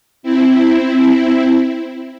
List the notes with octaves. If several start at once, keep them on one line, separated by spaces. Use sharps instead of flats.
C4 E4